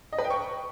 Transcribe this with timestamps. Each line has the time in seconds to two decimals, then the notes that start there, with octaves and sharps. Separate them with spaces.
0.12 D#5
0.18 B4
0.24 G5
0.30 C#6